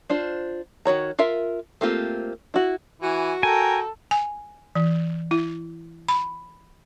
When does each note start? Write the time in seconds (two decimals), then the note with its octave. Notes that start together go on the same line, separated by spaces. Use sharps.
0.10 D4 F4 C5
0.85 D#3 F#4 C#5 A#5
1.19 F4 A#4 E5 F5
1.81 A3 A#3 C4 F4 G4
2.54 E4 F#4
3.02 E3 F#4 G#5
3.43 A4 A#4 G5 G#5 A#5
4.11 G#5
4.75 E3
5.31 E4
6.08 B5